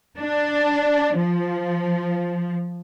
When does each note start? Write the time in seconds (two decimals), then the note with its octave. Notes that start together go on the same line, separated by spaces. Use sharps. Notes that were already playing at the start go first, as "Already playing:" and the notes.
0.19 D4
1.18 F3